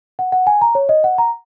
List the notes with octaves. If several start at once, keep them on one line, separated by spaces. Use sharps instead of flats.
F#5
F#5
G#5
A#5
C#5
D#5
F#5
A#5